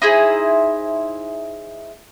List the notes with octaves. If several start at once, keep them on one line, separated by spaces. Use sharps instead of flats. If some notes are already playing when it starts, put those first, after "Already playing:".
D#4 E4 G#4 C5